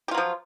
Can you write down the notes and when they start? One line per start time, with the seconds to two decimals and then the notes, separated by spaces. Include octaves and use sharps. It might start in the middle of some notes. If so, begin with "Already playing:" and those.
0.08 G4
0.11 F4
0.14 F#3
0.18 F3